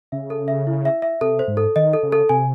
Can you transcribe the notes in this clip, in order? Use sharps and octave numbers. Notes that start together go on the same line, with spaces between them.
C#3 E5
A4
E5
E4
E5
E5
C3 A4
C5
G#2
A4
D#3 D#5
A4
C#3
A4
C3 G#5